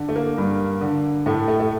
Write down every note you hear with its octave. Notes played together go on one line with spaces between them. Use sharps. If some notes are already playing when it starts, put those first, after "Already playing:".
Already playing: D3
A3
A#3
G2
D3
A2 A3
A3
A3